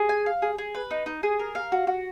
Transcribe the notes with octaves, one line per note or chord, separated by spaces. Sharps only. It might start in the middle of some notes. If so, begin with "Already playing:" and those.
Already playing: G#4
G#5
F5
G#4
G#4
B4
D#4
D#4
G#4
A#4
F5
F#4
F#4